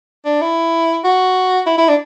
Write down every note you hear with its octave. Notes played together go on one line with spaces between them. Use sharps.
D4
E4
F#4
E4
E4
D4